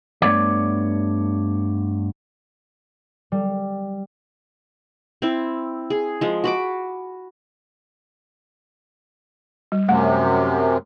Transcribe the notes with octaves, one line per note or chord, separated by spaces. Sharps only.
G2 A3 B3 C#5 D5
G3
C4 E4
G#4
F3 G#3
F#4 B5 D6
G3
F#2 C3 A3 F#5